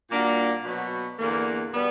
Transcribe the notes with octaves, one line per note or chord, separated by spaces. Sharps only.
A#2 G3 A#3 D4 F#4
B2 F#3 B3
E2 D3 A#3
B2 G3 B3